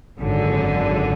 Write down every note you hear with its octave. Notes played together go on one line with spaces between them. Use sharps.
G#1 F#2 D3